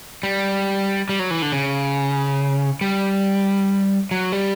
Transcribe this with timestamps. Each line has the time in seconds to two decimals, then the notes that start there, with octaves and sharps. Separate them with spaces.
0.23 G3
1.09 G3
1.19 F#3
1.31 E3
1.42 D3
1.53 C#3
2.81 G3
4.11 F#3
4.32 G3